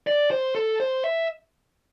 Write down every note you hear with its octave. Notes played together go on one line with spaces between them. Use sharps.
D5
C5
A4
C5
E5